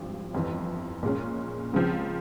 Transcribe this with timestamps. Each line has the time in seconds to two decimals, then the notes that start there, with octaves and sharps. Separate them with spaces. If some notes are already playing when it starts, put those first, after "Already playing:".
Already playing: G#1 G2 F3
0.34 G1 F2 E3
1.03 A#2 G#3 C#4
1.73 C#2 C#3 F3 G#3 C4